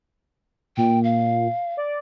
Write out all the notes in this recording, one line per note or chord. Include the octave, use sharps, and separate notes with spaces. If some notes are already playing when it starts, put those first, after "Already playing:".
A#2 G5
F5
D5